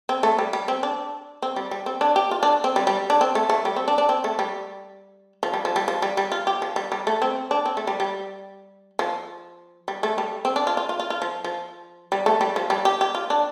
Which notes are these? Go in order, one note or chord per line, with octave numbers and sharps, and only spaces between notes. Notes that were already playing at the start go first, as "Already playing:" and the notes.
C4
A3
G3
G3
C4
D4
C4
G3
G3
C4
D4
G4
F4
D4
C4
G3
G3
D4
C4
A3
A3
G3
C4
D4
D4
C4
A3
G3
F3
G3
F3
G3
F3
G3
G3
F4
G4
F3
G3
G3
A3
C4
D4
C4
A3
G3
G3
F3
G3
A3
G3
C4
D4
F4
F4
F4
F4
F4
F3
F3
G3
A3
G3
F3
G3
G4
G4
F4
D4